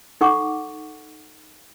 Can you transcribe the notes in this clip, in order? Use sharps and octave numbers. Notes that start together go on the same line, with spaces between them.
D#4 A4 F#5 C#6 D6